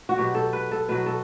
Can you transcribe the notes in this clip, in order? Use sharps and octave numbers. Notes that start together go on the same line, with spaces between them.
F#4
B2 F#3 G4
A4
B4
A4
B2 F#3 B4
A4